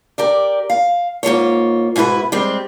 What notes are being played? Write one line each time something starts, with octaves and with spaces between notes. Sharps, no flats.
G4 A#4 D5
F5
G#2 A#3 F4 C#5
G#2 B2 E4 F#4 B4
G3 G#3 C4